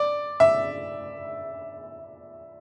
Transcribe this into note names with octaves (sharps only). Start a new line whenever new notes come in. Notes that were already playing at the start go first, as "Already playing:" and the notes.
Already playing: D5
E5